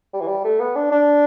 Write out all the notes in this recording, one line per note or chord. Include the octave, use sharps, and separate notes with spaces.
G3
E3
G3
A3
B3
D4
D4